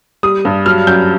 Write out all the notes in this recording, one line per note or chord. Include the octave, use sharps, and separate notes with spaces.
G3 D#6
G2
F#3 F6
F#2 G6